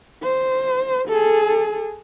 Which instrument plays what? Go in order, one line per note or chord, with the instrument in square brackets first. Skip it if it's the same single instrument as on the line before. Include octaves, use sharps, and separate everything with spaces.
[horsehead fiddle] C5
G#4 A4